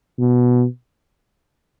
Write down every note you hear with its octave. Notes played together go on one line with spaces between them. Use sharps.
B2